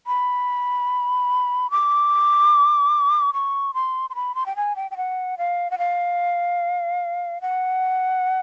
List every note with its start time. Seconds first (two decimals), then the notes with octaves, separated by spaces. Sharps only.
0.07 B5
1.71 D6
3.33 C#6
3.74 C6
4.10 C6
4.15 B5
4.35 C6
4.46 G5
4.56 G#5
4.76 G5
4.91 G5
4.97 F#5
5.38 F5
5.71 F#5
5.78 F5
7.41 F#5